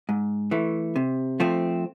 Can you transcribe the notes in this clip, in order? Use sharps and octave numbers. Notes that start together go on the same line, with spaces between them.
G#2
E3 A3
C3
F3 A3 C4